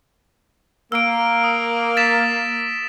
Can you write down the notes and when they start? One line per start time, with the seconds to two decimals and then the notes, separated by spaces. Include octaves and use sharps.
0.92 A#3 E6 D7
1.44 D#6
1.97 A6 B6 E7